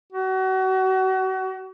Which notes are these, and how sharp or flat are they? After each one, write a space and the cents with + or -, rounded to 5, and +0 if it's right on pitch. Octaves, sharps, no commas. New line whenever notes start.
F#4 +35